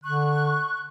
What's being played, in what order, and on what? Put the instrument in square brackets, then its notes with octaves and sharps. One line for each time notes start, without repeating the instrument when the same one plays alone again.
[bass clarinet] D3 [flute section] C#6 F#6